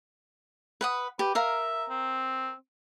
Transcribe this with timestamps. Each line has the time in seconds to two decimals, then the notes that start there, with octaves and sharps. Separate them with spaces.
0.81 B4 F#5 D#6
1.19 G4 B4
1.35 A#4 E5 F5 A#5
1.90 C4